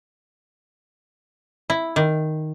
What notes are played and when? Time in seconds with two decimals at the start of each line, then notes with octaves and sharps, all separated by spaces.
1.70 E4
1.96 D#3